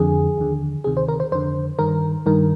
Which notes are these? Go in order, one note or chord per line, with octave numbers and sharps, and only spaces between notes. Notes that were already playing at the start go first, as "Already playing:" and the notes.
Already playing: F2 D3 G#4
D#2 D3
D2 C3 D#3 G#4
C5
A#4
C5
F2 D3 C5
G2 D#3 A#4
G2 D#3 A#4